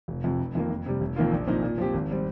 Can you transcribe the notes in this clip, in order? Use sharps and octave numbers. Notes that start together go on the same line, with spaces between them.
F1
F2 C3
F1
F2 D#3 A#3
F2
C3 G3
F1
F2 D#3 A#3 F4
A#1
A#2 F3 C4 D#4
A#2
F3 C4 G4
G#1
G3 C4